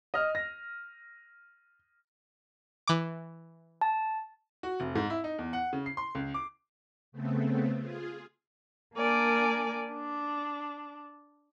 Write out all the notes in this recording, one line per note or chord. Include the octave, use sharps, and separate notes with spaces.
D#5 F6
A#6
E3 D6
A5
F#4
F1
G#2
E4
D#4
E2
F#5
C#3
C7
C6
C#2
D6
C#3 A3 B3 C4
F4 G#4
A#3 D4 A#4 D5 G#5
D4